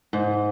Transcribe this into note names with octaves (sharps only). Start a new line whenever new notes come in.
G#2